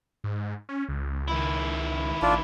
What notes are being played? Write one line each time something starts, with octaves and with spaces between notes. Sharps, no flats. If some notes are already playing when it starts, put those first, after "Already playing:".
G#2
C#4
C#2
D#3 E4
A1 D4 F4